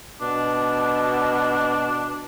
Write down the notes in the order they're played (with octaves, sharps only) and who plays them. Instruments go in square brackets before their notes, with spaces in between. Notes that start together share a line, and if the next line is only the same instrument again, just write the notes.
[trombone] B2 [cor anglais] D4